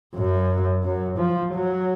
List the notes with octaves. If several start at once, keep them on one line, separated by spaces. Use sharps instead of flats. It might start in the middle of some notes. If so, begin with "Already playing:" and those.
F#2
F#2
F3
F#3